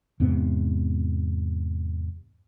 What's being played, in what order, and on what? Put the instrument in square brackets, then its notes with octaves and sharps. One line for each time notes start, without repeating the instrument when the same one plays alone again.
[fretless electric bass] E2 G#2 C3 B3